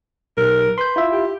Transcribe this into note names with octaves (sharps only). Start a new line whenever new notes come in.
B1 A#4
B4 C6 G6
E4 F4 E5
G4